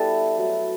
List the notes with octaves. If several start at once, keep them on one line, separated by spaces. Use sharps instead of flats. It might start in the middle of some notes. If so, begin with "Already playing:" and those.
Already playing: G3 B3 E4 A4 B4
F#3 A3 E4